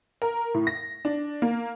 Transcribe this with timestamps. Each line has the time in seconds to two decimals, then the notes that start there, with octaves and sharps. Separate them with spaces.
0.22 A#4
0.54 A2
0.67 A#6
1.05 D4
1.42 A#3